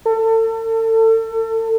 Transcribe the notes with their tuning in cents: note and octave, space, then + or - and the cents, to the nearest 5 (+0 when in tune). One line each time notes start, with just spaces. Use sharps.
A4 +35